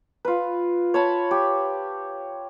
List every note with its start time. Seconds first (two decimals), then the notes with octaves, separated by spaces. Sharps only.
0.25 F4 B4
0.94 C#5 A5 B5
1.31 G4